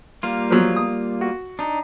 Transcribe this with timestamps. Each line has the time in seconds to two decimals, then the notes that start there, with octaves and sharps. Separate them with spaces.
0.23 G3 A#3 F4
0.51 F3 F#3
0.76 D#6
1.21 F#4
1.59 D4 D#4